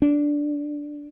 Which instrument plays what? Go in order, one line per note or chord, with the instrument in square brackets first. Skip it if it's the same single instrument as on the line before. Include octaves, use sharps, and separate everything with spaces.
[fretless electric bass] D4